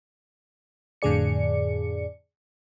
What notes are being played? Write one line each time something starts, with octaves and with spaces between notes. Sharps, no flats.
F2 A2 D3 G#4 D5 C#7